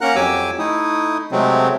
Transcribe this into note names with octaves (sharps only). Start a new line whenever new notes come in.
A#3 C#4 A#4 F#5 A#5 F#6
F2 F#3 G4 G#5 D6 E6
A3 D#4 E4 D#6
C3 F#3 G#3 A3 C4